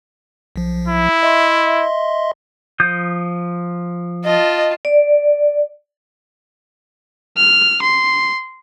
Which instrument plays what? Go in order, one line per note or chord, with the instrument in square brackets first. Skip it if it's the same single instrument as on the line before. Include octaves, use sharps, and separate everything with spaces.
[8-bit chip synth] B1 F3
[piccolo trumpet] E4
[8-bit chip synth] D#5 E5 C6
[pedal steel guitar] F3 D#6 G6
[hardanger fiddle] F4 A5 [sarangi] D#5
[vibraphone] D5
[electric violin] F6
C6